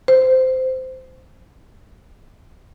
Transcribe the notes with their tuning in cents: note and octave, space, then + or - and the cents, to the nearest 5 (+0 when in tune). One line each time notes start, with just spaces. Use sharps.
C5 -15